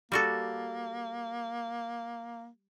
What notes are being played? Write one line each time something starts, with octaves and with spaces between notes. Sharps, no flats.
G3 A#3 F#4 A4